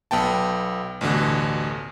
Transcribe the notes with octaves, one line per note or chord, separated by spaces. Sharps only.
B1 B3 G5 A5
A1 D2 B2 D3